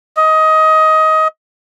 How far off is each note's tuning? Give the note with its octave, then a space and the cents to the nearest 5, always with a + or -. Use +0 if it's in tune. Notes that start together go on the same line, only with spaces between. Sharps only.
D#5 +20